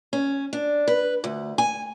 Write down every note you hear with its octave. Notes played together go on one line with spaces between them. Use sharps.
C#4
D4
B4
D2
G#5